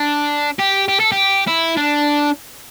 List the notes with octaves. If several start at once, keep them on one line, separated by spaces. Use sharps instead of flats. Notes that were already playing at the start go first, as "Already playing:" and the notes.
Already playing: D4
G4
G4
A4
G4
E4
D4